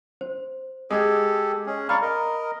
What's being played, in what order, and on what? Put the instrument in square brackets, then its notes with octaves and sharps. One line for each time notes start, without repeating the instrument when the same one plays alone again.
[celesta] C5
[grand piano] G#3 [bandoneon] G4 A4 [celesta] D#6 G#6
[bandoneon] G#3 C#4 G#4
[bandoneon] D5 F5 C#6 [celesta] A#5 B5 [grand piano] F6
[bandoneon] A#4 D#5